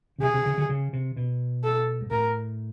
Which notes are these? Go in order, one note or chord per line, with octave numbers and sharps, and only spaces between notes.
C#3
C3 G#4
C3
C#3
D3
C#3
C3
B2
A4
G#2
A2 A#4